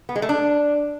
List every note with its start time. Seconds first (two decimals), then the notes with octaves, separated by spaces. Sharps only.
0.09 B3
0.16 G#3
0.22 A3
0.29 D4